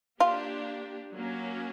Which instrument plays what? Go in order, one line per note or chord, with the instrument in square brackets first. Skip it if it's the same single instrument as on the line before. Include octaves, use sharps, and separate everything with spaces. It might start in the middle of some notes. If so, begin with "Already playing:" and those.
[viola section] A#3 D4 G4 [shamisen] F4
[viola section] F#3 A#3 C#4